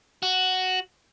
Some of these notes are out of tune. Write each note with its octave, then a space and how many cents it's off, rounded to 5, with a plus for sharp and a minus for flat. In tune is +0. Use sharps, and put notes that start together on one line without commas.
F#4 +5